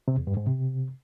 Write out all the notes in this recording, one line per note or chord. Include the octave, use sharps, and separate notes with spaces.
C3
E2
G2
G#2
C3